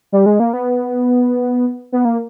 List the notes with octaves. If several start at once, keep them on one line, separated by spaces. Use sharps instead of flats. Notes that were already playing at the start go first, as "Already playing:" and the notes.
G3
G#3
A#3
B3
B3
A#3